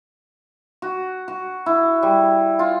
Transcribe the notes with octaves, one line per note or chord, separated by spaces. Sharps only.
F#4
F#4
E4
G3
F4